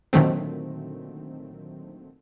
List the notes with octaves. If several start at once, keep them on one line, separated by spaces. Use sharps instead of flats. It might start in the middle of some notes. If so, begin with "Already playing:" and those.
A#2 D3 D#3 F#3 A3 C4